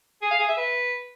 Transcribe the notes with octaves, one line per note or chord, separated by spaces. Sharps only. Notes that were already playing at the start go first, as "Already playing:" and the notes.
G#4
F5
G#4
E5
B4